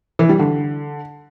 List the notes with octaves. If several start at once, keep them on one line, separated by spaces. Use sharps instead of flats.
E3
G3
D3